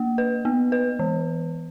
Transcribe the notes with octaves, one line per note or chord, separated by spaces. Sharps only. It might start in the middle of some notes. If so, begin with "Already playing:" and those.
Already playing: A#3
B4
B3
B4
E3